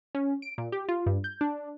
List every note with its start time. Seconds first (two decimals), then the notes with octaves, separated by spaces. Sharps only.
0.15 C#4
0.42 D7
0.58 A#2
0.72 G4
0.89 F4
1.06 G2
1.24 G6
1.41 D4